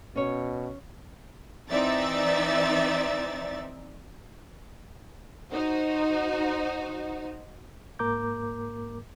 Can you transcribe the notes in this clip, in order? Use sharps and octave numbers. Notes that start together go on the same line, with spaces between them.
B2 C#4 C#5
E3 C4 D#4 D5 E5 A6
D#4 F#4 C5
G#2 A#3 A#4 A#5 D6 G6